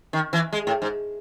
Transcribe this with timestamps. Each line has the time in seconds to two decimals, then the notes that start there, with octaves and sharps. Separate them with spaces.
0.13 D#3
0.33 E3
0.53 G#3
0.67 A2
0.82 G#2